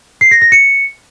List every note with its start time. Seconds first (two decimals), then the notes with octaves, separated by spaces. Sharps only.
0.21 C7
0.31 A#6
0.42 A#6
0.52 C#7